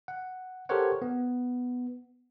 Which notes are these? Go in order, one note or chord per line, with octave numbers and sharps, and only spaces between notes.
F#5
G4 A4 A#4 C5 C#5 F#5
B3